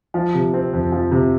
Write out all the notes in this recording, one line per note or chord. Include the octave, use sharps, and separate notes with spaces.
F3
C3
C4
F2
F3
C3